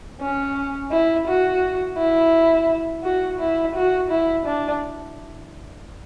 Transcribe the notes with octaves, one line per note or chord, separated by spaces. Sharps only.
C#4
E4
F#4
E4
F#4
E4
F#4
E4
D4